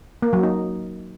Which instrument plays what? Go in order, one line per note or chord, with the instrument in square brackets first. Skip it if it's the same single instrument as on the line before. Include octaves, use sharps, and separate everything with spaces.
[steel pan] A#3
F#3
D#4